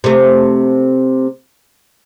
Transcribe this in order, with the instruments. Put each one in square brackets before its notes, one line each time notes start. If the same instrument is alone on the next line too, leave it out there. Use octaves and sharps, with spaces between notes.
[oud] C3 A3